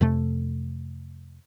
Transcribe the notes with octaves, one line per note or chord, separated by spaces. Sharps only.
F2 C3 A3